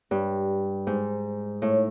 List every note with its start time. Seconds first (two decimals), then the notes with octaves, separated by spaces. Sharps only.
0.11 G2
0.87 G#2
1.62 A2